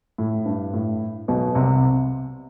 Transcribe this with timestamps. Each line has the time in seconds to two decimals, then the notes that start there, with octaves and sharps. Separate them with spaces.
0.18 A2
0.45 G2
0.73 A2
1.28 B1 B2
1.55 C2 C3